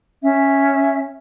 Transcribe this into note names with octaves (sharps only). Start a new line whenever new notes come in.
C#4 E5